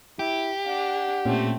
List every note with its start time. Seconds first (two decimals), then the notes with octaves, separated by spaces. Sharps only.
0.19 E4 G4
0.66 D4 F#5
1.25 A#2 A3 C4 C#4